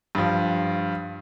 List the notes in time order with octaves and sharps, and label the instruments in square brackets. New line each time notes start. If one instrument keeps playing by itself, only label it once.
[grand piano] G2 F3